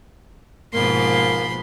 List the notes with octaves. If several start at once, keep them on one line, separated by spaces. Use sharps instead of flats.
G#2 B2 F3 A#3 B5 C6